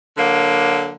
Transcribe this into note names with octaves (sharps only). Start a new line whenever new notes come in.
D3 F#3 A#3